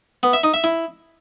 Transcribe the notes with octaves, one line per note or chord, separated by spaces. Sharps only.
B3
E5
D#4
E5
E4